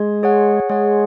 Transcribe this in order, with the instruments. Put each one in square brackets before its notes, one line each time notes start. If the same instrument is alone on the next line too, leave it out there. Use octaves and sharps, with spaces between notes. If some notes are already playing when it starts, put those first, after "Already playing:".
Already playing: [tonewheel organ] G#3
[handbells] G#4 C#5 F#5
[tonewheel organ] G#3 [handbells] G#4 C#5 F#5